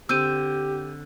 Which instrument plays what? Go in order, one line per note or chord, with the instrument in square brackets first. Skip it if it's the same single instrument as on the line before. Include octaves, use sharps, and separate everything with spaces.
[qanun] D3 C4 D6 [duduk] G4 [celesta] E6 G6 D#7